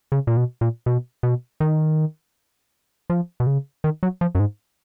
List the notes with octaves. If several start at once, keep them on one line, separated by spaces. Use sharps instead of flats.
C#3
A#2
B2
A#2
B2
B2
D#3
F3
B2
C#3
D#3
F#3
F3
F#2
G#2